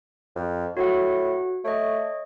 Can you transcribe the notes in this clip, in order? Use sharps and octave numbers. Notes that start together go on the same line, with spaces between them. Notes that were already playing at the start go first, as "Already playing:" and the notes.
F2
A2 F#4 F#5
A3 C#5 D#5